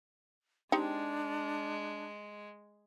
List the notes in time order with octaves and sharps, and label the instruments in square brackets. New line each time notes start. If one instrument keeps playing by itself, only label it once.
[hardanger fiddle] G#3 [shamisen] C4 D#4 G4 [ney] D4